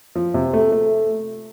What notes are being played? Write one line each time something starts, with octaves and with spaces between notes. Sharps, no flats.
F3
C3
A3
A3